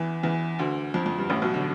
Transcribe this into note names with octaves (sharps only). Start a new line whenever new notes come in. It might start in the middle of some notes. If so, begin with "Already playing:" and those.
Already playing: E2 E3
E2 E3
D2 D3
F2
F2
G2
A1 A2
B1 B2
D3